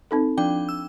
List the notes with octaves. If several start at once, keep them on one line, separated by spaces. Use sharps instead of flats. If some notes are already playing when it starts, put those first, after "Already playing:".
C4 D#4 A4
F3 D4 G5
E6